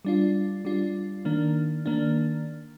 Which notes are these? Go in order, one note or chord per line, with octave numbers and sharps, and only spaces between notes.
G3 D4 F4
G3 D4 F4
D#3 A#3 D4
D#3 A#3 D4